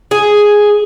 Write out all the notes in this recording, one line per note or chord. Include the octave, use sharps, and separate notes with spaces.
G#4